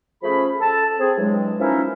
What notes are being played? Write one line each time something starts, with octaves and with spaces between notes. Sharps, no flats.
F3 A3 C#4 G#4 B5
A4 A5
C4 G#4
G2 E3 F#3 G#3
F3 A#3 C#4 D#4 E4 E5